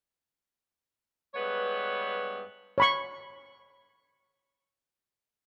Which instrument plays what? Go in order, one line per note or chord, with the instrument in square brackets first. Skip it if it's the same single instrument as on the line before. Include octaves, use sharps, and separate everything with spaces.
[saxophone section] G2 G#3 B3 B4 C#5
[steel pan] C#5 B5 C#6